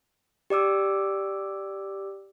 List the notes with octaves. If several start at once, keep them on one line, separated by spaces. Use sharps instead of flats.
G4 D5 D6 E6